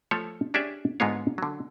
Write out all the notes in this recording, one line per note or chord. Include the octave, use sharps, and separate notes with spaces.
F3 A3 A4 C#5
C#4 D4 G4 G#4 D5 E5
G#2 D3 G#3 B3 F4 C#5
D3 F#3